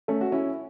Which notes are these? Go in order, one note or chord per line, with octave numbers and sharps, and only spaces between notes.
A3 C#4
F#4
C#4 E4